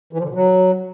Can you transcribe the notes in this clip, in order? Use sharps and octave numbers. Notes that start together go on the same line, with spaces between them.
E3
F3
D3
B2
F#3